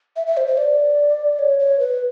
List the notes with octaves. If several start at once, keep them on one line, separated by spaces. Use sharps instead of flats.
E5
E5
C5
C5
D5
C#5
C#5
B4